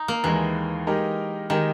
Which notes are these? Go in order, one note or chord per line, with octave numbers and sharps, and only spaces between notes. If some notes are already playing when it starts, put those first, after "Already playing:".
Already playing: D#4
A#3
D#2 D#3 E3 G#3
G#3 D#4 G4 A#4
D#3 G#3 D#4 G4 A#4